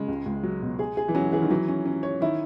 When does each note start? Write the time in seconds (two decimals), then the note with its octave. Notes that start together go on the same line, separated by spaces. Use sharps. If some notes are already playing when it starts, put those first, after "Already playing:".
Already playing: C#3 G#3
0.08 C#2
0.26 C#2
0.43 F#3
0.62 B2
0.79 G#4
0.97 G#4
1.08 E3
1.15 F#3 C#4
1.32 E3 G#4
1.42 D#3
1.50 E3 F#3
1.68 C#4
1.85 C#4
2.03 C#5
2.21 D#3 E4